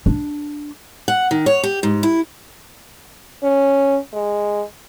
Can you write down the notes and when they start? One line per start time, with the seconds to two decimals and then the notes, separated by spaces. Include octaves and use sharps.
0.06 D4
1.08 F#5
1.31 D#3
1.46 C#5
1.63 G4
1.83 G#2
2.03 E4
3.43 C#4
4.13 G#3